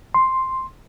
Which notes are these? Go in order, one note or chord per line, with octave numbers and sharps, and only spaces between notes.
C6